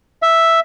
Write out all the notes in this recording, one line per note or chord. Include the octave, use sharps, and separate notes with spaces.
E5